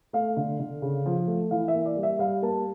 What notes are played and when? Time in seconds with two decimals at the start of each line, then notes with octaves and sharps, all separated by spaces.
0.13 A3 F5
0.37 D3
0.59 D3
0.82 C#3
1.06 F3
1.27 A3
1.51 E3 F5
1.68 E5
1.74 A#3
1.86 D5
1.97 G3
2.03 E5
2.19 G3 F5
2.42 A#3 A5